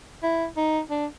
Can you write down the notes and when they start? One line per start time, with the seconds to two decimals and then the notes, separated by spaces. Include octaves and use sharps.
0.23 E4
0.57 D#4
0.90 D4